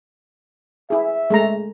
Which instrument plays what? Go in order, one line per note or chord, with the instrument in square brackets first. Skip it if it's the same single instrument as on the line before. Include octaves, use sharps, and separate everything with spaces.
[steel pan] E4 G#4 [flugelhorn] E5
[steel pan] G#3 A3 A#5